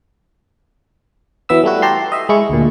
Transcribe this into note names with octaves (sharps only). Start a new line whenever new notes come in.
E3 F#3 B3 E5 E6
G3 A3 E4 F#4
G4 A5 A#5 C6
D#5 E5
G#3 E4 C#6
D2 A#2